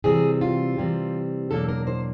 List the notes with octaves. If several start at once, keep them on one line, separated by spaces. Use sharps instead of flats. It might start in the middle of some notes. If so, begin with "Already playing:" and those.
C3 E3 G3 C4 G#4
F4
C3 E3 G3 C4
E2 B2 F#3 A#3 D4 A4
A#4
C5